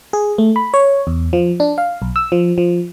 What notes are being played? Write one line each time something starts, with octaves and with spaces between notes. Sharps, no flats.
G#4
A3
B5
C#5
E2
F3
D4
F5
B1
E6
F3
F3